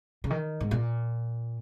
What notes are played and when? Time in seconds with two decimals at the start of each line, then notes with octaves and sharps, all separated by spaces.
0.24 C#3
0.30 D#3
0.61 G#2
0.71 A#2